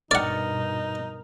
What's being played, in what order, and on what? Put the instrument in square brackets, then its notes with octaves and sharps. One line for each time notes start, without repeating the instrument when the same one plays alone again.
[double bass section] G2 B2 [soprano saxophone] D#4 [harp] A#4 [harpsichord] D5 F#5